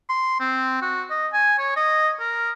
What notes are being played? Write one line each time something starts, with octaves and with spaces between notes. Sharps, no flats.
C6
C4
F#4
D#5
G#5
C#5
D#5
A#4